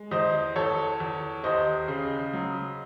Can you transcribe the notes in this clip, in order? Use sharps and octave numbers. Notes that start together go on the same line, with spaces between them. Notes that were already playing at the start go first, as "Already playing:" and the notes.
Already playing: G#3
E2 C5 D#5
E2 A4 C#5
E2
D#2 C5 D#5
C#3
F#3